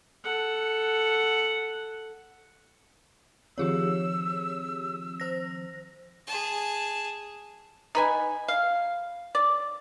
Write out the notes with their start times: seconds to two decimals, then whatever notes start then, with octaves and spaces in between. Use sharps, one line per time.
0.24 A4 F#5
3.58 D#3 F3 C4 G4 G#4 C#5 E6
5.20 C5 A#6
6.27 G#4 A5
7.95 D#4 B4 G#5
8.48 F5
9.35 D5